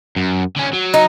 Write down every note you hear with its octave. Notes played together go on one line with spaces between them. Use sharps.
F#2
D3 C#4
F#3
D#4